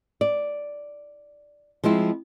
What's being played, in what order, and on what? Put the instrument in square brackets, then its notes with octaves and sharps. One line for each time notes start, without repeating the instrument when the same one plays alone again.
[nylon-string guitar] D5
F3 G#3 C4 E4